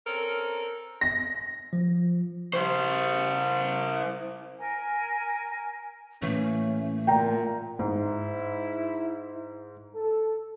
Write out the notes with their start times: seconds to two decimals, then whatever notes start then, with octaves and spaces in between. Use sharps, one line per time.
0.07 C4 C#4 A4 A#4
1.01 A#6
1.73 F3
2.53 E4 C5
4.58 A#4 G#5
6.22 A2 E3 A3 A#3 C#4
7.07 A#2 G5 A#5
7.79 G#2 E4
9.95 A4